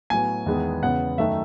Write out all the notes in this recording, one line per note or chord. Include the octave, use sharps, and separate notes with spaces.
A2 F#3 B3 G#5
E2 D#3 G#3 B3
E2 C#3 G#3 B3 F#5
F#2 D#3 A3 E5